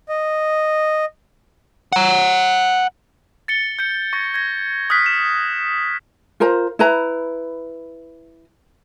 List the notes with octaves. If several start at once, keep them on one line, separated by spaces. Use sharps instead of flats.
D#5
F#5 A#5
A6 C#7 G7
G6 C#7
C#6 G#6 A#6
G#6 A#6
D#6 F6 F#6 B6
E7
F4 A#4 C5 A#5
E4 B4 A#5